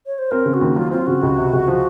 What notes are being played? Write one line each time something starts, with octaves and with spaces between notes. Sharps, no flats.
C#5
C5
C4 A#4
C#3
F#4
D#2
F#3 F4
C4 F4
C#3 F#4
C#2
C3
C#2
F3